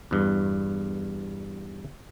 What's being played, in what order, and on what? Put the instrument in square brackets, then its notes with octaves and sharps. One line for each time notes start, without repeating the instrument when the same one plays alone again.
[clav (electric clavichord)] E2 G2